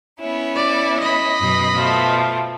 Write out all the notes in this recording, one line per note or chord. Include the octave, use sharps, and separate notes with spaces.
B3 C#4 E4
D5
D#5 B5
F#2 B2
B2 F3 A3